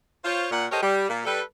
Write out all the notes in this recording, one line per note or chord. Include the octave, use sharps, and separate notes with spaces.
F4 C5 C#5
A#2 F#5
G4 A4 A#4 C5 C#5 D#5
G3
A#2
G3 A4 B4